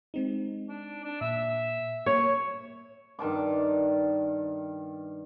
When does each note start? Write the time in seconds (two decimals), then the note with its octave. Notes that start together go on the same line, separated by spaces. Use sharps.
0.14 G#3 C4 D#4
0.69 D4
1.04 D4
1.21 A#2 E5
2.06 A#3 C#5
3.19 G2 D#3 A5 D6